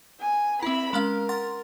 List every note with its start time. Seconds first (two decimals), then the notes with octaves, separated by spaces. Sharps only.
0.20 G#5
0.63 C4 E4 E5 B5
0.93 G#3 C#4 A#4 F5
1.29 F#5 C6 A6